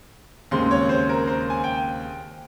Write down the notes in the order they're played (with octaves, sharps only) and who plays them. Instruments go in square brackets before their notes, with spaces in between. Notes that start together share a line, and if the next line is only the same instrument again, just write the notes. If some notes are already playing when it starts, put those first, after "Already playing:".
[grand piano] D#2 C#3 G#3 C4 C6
C#5
C5
A#4
C5
G#5
G5